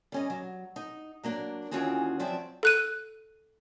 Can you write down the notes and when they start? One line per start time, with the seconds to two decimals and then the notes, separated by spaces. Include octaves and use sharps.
0.12 G3 C#4 D#5
0.30 F#3
0.76 D#4
1.23 F#3 A#3 D4
1.71 D#2 E3 C#4 F4 F#4 G#4
2.19 F3 F#3 C4 D5 E5
2.63 A4 F#6 D#7